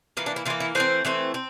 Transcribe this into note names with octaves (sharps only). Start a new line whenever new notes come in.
E3 A#3 F4
D4
E4
E3 A#3 F4
E4
E3 A3 C4 C5
E3 A3 C4
C4